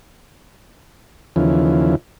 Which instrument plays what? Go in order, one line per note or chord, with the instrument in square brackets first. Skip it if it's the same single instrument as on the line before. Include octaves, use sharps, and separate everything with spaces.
[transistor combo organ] D#2 C#3 E3 F3